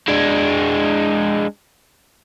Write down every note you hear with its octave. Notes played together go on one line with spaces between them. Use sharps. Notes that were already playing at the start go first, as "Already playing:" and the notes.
G#3 D4